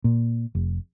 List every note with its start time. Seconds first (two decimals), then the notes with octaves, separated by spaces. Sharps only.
0.04 A#2
0.55 F1